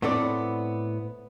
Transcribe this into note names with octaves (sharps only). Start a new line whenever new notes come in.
A2 B3 C4 A4 D5